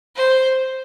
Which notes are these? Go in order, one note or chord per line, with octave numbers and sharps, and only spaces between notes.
C5